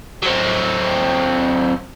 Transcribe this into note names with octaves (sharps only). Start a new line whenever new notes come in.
F#3 C4